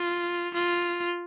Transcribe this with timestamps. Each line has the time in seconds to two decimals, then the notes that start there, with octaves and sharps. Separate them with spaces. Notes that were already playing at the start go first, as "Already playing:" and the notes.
Already playing: F4
0.54 F4